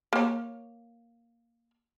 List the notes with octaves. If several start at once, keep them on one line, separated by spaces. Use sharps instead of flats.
A#3 C#5